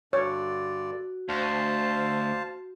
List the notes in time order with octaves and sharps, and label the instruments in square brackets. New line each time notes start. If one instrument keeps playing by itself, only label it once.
[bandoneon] G2 D3 D5 [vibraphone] F#4 [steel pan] C#5
[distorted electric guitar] D2 [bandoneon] C5 F5 A5